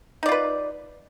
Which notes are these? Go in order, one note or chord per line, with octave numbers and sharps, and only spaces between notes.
D#4 F4 B4 D5